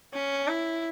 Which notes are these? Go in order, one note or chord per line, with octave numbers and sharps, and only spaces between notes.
C#4
E4